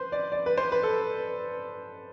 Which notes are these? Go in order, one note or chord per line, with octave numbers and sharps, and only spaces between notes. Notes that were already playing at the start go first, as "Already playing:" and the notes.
Already playing: B4 C5
D5
D5
B4
C5
B4
A4